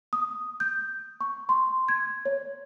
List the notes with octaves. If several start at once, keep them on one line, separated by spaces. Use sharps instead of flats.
D#6
G6
C#6
C6
G#6
C#5